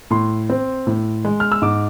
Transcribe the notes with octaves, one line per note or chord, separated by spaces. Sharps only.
A2 C6
C4
A2
G#3
F6
E6
G#2 D6